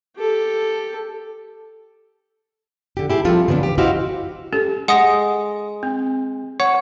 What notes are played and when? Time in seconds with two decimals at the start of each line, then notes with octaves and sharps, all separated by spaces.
0.17 G4 A4
2.97 D3 G4
3.10 E4 G4 G#4
3.25 F3 G3 C4 F4 A4
3.48 C#3 E3 B3 D4
3.63 G4
3.78 E4 F#4 G4 C5 D#5 F5
4.53 C#4 G4 A4
4.88 G#3 D#5 F#5 D#6
5.83 C4
6.60 C#5 F#5 C#6